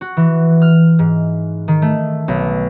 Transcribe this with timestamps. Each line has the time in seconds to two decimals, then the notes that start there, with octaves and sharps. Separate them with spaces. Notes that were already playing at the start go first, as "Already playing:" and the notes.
0.01 F#4
0.17 E3
0.62 F6
0.99 G#2
1.68 D#3
1.82 A3
2.28 B1